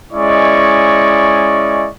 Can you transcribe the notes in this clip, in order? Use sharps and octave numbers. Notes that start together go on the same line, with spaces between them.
G#3 C#4 E4 D5 D#5 C#6